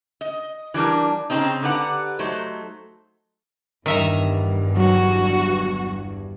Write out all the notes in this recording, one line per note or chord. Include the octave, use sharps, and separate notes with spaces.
D#5
E3 G3 D4 A#4
C#3 C4 D#4
D3 G4 B4 F#5 A#5
F#3 A3 D#4 C5
G1 E2 G2 D#3 E5 A#5
F#3 F#4